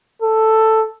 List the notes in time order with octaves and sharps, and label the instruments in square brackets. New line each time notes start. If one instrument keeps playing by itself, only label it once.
[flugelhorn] A4